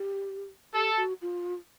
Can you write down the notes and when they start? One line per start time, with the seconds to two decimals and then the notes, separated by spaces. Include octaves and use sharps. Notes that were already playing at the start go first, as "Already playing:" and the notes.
Already playing: G4
0.74 G4 A4
0.97 F#4
1.22 F4